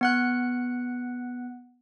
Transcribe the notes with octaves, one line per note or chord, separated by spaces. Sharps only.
B3 F#5 F#6